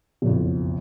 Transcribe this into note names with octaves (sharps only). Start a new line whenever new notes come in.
F#1 B1 F2